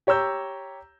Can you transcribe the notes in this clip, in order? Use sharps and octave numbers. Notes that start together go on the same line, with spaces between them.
G4 C#5 A#5 E6 G6